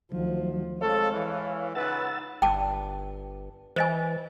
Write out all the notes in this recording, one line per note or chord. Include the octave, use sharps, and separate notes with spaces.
D2 D#3 F3 F#3
G#3 C4 A4 C#5 F5
E3
C#2 D#4 B4 F#5 E6 A6
G1 G5 A5 D6
E3 C5 D#5 G#5